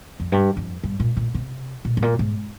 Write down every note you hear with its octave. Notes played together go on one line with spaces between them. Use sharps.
F2
G2
F2
G2
A#2
A#2
C3
A#2
G#2
A#2
G#2